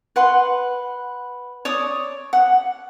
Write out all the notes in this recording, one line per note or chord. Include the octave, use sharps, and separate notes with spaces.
B4 F#5 C6
C#5 D5 D#6
F#5